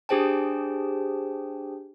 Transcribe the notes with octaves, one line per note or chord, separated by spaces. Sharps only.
D4 G4 G#4 C5 G5 A5